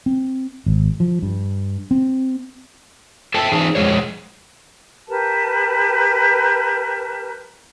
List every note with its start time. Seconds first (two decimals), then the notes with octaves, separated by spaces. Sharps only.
0.06 C4
0.66 G#1
1.00 F3
1.22 G2
1.91 C4
3.34 A4 E5 G5 A5
3.52 E3 D#4 G#4
3.75 F2 G#3 G#4 C#5
5.08 G4 A#4 B4 A5